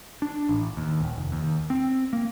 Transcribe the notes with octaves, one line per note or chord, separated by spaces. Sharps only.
D4
A1
D#2
D#1
F1
D#2
C4
A#3